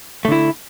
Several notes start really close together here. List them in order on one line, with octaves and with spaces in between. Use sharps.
A3 D3 E4